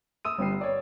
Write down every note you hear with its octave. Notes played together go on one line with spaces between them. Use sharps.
D#6 E6 D#7
G1 G3 G5 C7
C#5 D5